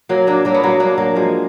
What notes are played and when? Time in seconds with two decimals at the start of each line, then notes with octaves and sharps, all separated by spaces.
0.09 F#3 A#3
0.27 A#3 D4
0.45 F#3 A#3
0.54 B3
0.63 F#3 A#3
0.80 A#3 D4
0.98 F#3 A#3
1.15 F3 G#3